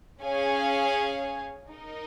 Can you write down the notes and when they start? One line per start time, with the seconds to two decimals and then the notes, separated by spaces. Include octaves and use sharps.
0.22 C#4 G#4 C#5 F5 G#5
1.70 D#4 A#4 D#5